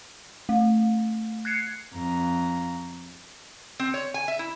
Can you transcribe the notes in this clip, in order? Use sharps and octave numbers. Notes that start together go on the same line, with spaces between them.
A3
F#6 G#6 C7 C#7
F2 A#5
C4
C#5
G#5
E5
E4